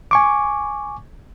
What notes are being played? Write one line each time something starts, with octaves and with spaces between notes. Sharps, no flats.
G#5 C#6 D6